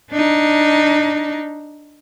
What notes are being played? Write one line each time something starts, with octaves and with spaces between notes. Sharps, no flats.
D4 D#4